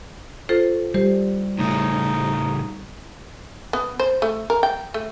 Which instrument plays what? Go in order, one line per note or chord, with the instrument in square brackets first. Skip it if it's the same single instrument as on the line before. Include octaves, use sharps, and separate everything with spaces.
[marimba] F4 A4 C5
[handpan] G3 [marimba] G4 C5
[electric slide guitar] A2 C#3 A3 [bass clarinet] D#4
[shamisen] B3
C5
A3
A#4
G5
A3